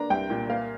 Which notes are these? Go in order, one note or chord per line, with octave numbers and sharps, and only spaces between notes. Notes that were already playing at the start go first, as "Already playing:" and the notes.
Already playing: A#3 D4 A#5
C2 G5
A#2
A#3 F5